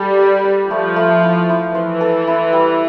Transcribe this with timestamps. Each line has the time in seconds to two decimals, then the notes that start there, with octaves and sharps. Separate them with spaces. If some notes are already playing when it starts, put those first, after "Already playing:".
Already playing: G3 A4 D5
0.19 B4
0.44 B4
0.70 F3 A3
0.96 A3
1.23 E4
1.49 E4
1.74 E3 C5
2.01 A4
2.27 E4
2.53 G3